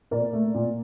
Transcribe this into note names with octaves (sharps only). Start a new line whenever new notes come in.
A#2 A#4 D5
A3
A#2